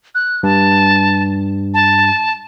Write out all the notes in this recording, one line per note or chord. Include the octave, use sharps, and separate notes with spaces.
F#6
G2 A5
A5